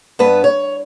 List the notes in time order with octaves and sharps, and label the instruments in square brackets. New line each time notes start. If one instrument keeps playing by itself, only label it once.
[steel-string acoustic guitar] G2 B3 B4 A5
C#5